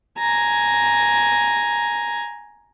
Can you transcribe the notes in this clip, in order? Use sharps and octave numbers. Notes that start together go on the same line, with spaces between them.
G#5 A#5